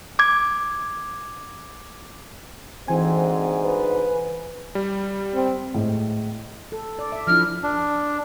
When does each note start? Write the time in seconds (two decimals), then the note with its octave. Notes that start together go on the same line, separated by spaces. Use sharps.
0.19 D6 G#6
2.88 D2 G#2 E3 C4 G#5
3.64 B4
4.75 G3
5.35 C4
5.74 A2 G#3
6.72 A4
6.99 D5
7.12 E5
7.27 F3 D4 E4 F6
7.63 D4